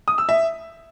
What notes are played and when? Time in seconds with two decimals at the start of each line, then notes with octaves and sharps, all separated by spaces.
0.08 D#6
0.18 E6
0.29 E5